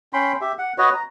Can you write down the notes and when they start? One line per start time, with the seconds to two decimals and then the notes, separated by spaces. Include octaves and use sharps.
0.13 C#4 G5 B5 C6
0.41 G4 E5
0.59 F#5
0.78 F#4 B4 C#5 D#5
0.94 A#5